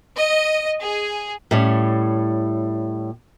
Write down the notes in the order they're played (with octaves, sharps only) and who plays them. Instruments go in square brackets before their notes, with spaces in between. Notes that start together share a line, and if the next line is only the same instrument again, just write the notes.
[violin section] D#5
G#4
[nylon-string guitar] A2 G3 C#4